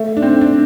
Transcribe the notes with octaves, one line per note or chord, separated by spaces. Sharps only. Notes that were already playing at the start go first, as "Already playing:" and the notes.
Already playing: A3
D4
C4
D4